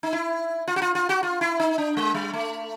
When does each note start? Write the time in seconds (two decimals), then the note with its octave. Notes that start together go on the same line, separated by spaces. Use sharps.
0.03 D#4
0.13 E4
0.68 F4
0.76 F#4
0.82 F4
0.95 F4
1.09 F#4
1.23 F4
1.41 E4
1.60 D#4
1.78 D4
1.97 G#3
2.14 G3
2.33 A3